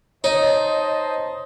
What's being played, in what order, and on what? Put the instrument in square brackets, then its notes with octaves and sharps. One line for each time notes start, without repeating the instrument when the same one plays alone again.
[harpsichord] D#4 [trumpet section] C5 D#5 A5 [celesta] C#5